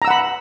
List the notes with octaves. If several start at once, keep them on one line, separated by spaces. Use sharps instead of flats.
F#5 A#5 B5 E6